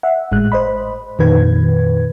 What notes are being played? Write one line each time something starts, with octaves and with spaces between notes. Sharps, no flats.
E5 F#5
G#1 A2 G#3 F#6
C5 D#5 B5
F2 A#2 D#3 B4 G#6